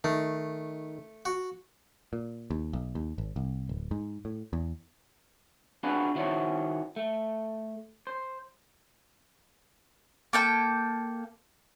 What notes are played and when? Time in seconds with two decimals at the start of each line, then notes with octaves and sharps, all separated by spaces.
0.04 D#3 A3
1.25 F#4
2.13 A#2
2.51 D#2
2.73 B1
2.95 D#2
3.18 G#1
3.36 C2
3.69 D1
3.91 G#2
4.25 A2
4.53 E2
5.83 D4 F4 F#4 G#4 B4
6.15 D#3 E4 F#4 C5 C#5
6.96 A3
8.07 C5
10.33 A#3 A4 G5 A5